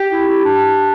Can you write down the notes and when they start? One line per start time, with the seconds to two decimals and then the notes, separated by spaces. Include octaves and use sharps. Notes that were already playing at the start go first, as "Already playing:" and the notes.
Already playing: G4
0.11 E4
0.28 E4
0.45 D4